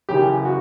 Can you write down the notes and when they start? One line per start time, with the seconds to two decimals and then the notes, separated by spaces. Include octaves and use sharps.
0.09 F#2 C#3 E3 G4
0.45 F#4